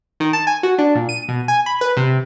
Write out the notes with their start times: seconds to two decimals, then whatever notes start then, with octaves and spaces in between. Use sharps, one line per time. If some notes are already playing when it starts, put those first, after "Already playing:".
0.20 D#3
0.33 A5
0.47 G#5
0.63 F#4
0.78 D4
0.95 A#2
1.09 D#7
1.28 B2
1.48 G#5
1.66 B5
1.81 B4
1.97 C3